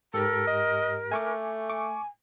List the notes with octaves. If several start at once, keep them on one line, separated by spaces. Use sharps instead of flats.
G#2 G4 A4 A#4
D#5
A3 G#5 C#6 D6
G#5 C#6 D6